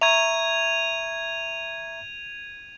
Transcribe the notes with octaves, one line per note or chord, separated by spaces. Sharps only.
E5 A#5 C#6 G#6 D#7 F7